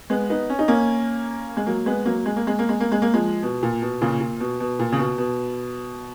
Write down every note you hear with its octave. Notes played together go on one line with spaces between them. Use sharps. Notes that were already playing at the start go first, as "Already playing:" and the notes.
G#3 B3
B3 D#4
C#4
D#4
A#3 C#4
G#3
F#3 A#3
G#3 B3
F#3 A#3
G#3
A#3
G#3
A#3
G#3
A#3
G#3
A#3
F3 G#3
B2
A#2
B2
A#2 C#3
A#2
B2
B2
A#2
C#3
B2
B2